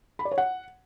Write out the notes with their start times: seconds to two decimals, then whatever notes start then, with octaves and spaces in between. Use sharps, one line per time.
0.19 B5
0.25 D5
0.32 C#5
0.38 F#5